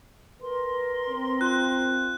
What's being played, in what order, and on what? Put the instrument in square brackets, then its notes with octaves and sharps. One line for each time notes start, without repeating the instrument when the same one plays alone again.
[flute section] A#4 C6 [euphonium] B4
[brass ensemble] C4
[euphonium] F4 [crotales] F#6